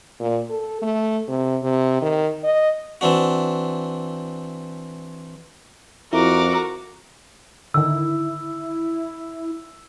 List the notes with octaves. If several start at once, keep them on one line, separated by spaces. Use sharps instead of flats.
A#2
A4
A3
C3
C3
D#3
D#5
E3 C4 D4 F#4
F2 E4 F#4 A#4 D6
D3 D#3 E4 E6